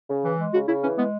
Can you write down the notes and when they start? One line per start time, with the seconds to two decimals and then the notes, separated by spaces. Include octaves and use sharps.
0.08 C#3
0.24 E3
0.38 G#3
0.53 C#3 F#4
0.67 C#3 E4
0.83 E3 C#4
0.98 G#3 B3